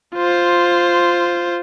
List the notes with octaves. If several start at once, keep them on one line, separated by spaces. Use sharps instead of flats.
F4 C5